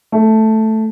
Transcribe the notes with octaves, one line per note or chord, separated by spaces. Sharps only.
A3